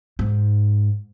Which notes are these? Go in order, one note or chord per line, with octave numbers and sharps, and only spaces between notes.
G#2